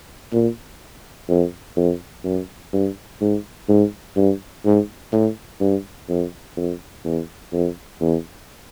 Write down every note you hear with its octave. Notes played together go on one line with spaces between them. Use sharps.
A#2
F2
F2
F#2
G2
G#2
G#2
G2
G#2
A2
G2
F2
F2
E2
F2
E2